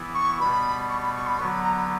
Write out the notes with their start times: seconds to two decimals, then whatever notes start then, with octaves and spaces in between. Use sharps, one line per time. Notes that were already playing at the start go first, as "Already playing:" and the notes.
Already playing: E3 B3 E4
0.14 C#6
0.39 B2 G3 B3 B5
0.89 C#6
1.01 B5
1.14 C#6
1.26 B5
1.38 D3 F#3 B3 C#6
1.51 B5
1.63 A#5
1.76 B5